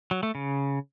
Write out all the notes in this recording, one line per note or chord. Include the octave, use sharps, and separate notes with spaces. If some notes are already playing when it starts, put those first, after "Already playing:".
F#3
A3
C#3